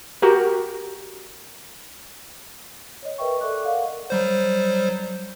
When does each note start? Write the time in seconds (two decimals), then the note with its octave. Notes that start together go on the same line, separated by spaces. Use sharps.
0.22 F#4 G4 A#4
3.03 C#5 D#5
3.18 A#4 B4 D#5 E5 G5 C#6
3.41 A4 D5 E5 C#6 D6 F#6
3.64 A#4 D5 D#5 F5 F#5
4.10 F#3 G3 C5